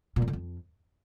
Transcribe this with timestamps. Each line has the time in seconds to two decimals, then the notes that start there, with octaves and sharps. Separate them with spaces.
0.16 A#2
0.22 F2
0.28 D3
0.33 F2